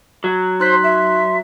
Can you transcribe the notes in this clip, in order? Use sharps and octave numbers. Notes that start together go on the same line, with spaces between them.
F#3
D#4 C5 C6 F#6 B6
E5